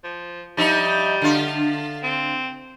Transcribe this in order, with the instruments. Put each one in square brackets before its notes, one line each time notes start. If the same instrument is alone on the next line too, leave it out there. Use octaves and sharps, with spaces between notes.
[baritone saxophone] F3
[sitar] F3 D#4 E5 [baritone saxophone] G3
[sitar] D3 F4
[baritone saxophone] C4